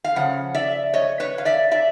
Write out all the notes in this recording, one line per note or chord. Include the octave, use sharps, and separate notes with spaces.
F5
C#3 F3 F#5
D5 E5
C#5 D#5
B4 C#5
F5
D5 E5
D5 E5